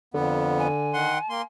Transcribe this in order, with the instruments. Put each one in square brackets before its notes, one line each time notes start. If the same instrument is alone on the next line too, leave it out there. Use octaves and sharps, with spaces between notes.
[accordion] F2 B3 [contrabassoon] D3
[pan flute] G#5
[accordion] D#3 F#5 C6
A#3 C6